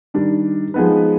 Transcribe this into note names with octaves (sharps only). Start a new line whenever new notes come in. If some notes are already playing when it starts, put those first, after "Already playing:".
D#3 G3 D4
F3 G#3 B3 D#4 B4